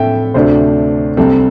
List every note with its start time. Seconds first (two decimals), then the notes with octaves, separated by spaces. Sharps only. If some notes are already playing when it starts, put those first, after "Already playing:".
Already playing: A2 A3 C4 A4 E5 G5
0.34 D2 C3 A3 D4 C5
1.17 C2 C3 G3 C4 A4